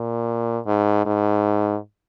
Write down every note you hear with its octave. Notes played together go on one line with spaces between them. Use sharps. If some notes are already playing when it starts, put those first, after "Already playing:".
Already playing: A#2
G#2
G#2